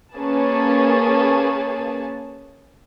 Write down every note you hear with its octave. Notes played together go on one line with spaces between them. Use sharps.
A#3 C#4 G#4 B4 A5